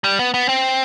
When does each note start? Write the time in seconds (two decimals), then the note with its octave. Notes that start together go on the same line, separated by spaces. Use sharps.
0.04 G3
0.19 B3
0.34 B3
0.49 C4